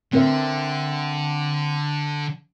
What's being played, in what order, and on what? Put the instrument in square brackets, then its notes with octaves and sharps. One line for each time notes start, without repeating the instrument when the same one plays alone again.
[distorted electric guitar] D3 [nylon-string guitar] C4 A#4 E5